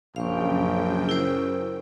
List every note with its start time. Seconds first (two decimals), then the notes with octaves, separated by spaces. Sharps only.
0.16 A#1 F#2 C#3 F5 G5 C#6
1.09 E4 A#4 C5